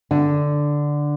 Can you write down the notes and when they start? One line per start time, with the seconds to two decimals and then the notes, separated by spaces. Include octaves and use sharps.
0.11 D3